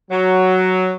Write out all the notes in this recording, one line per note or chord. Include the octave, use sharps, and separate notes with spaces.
F#3